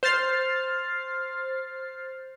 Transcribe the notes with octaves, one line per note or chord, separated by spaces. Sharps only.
C5 F6 A6 C7